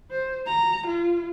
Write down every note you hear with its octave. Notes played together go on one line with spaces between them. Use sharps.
C5
A#5
F4